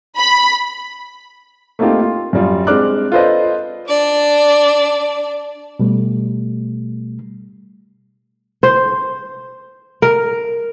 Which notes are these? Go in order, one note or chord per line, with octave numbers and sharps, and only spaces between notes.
B5
A3 A#3 C4 D#4 F4 G4
F4
F#2 G3 F4
G#3 C4 D4 D6 F6 F#6
F4 A4 B4 C5 D5 D#5
D4 D5
B2 G3 A3
C5
A#4